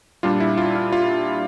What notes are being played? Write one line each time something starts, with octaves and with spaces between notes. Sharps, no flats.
A#2 G3 D4 F4
E4
F4
F4
F4